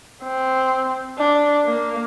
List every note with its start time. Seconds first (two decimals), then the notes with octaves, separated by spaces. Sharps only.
0.24 C4
1.18 D4
1.65 A#3